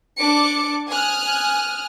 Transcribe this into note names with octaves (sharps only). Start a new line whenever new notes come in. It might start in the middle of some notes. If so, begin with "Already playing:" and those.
D4 D5 D6 C#7
G#5 D#6 F6 F#6